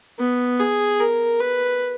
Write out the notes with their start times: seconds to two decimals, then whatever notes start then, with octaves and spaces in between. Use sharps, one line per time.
0.19 B3
0.59 G#4
1.00 A#4
1.40 B4